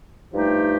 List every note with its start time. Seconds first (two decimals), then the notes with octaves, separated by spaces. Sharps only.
0.33 G2 F3 A3 D#4 G4